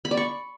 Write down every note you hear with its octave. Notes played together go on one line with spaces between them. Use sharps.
B5
D5
C#6